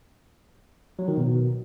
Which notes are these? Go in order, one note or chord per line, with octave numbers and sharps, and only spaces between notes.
F#3
D#3
B2